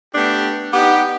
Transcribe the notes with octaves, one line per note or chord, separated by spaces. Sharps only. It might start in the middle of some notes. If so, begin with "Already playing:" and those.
A3 B3 D4 G4
B3 D#4 G4